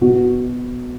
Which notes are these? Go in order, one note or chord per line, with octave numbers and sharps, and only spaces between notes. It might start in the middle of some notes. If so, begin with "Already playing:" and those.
B2 B3 F#4